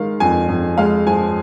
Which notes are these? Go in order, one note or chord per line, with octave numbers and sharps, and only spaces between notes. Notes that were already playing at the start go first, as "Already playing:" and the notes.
Already playing: D#3 G#3 F5
F2 G#5
F2
G#3 F5
F3 G#5